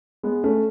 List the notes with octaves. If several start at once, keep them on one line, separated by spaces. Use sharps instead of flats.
G#3 B3
A3 C#4